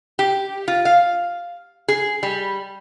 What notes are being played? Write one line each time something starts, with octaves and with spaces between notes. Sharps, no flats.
G4
F4
F5
G#4
G3